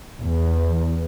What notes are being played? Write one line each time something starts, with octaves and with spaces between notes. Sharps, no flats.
E2